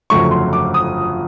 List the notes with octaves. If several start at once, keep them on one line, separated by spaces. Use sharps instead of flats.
G1 F2 C#3 F#3 A3 C#6
C6
D6
D#6